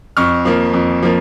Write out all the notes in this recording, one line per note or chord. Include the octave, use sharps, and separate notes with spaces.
F2 C#6 F6
F3 A#3
F2
F3 A#3